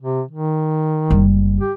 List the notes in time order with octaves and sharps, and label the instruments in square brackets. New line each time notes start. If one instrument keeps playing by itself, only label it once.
[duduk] C3
D#3
[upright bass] F#1 G3
[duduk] G4